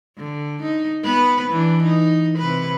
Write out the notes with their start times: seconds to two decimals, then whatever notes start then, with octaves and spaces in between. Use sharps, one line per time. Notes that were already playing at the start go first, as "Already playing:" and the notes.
0.17 D3
0.62 D#4
1.04 B3 B4
1.50 E3 D4
1.83 D#4
2.38 C3 B4